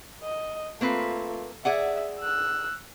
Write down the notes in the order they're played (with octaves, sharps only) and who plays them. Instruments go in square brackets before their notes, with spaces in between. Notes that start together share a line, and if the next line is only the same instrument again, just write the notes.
[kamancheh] D#5
[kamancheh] A3 F4 [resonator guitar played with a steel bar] A#3 C4 B4
[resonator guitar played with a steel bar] G#4 D5 F#5 [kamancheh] E5
[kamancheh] E6 F#6